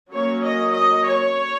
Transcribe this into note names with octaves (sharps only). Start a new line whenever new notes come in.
F#3 A#3 C#4 C#5
D#5
D#5
C#5